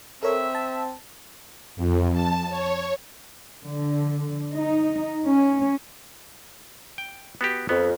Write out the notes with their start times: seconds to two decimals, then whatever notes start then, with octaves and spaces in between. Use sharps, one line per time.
0.23 C4 A4 A#4 C#5 E5
0.55 A5
1.76 F2
2.13 A5
2.50 C#5
3.65 D3
4.54 D#4
5.26 C#4
6.98 G5
7.41 B3 F#4 G4
7.69 F2 B3